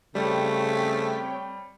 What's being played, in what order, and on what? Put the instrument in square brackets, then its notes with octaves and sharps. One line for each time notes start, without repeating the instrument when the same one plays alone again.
[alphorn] C#3 [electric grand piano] G3 [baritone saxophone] A3 [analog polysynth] C4 C#5 G5